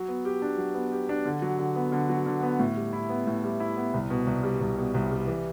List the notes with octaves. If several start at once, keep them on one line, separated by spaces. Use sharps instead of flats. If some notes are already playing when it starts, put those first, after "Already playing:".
Already playing: F#3
B3
G4
D4
F#3
B3
G4
D4
D3
F#3
D3
B3
D3
F#3
D3
B3
A2
G3
E4
B3
A2
G3
E4
B3
C2
B2
C2
G3
C2
B2
C2
G3
E3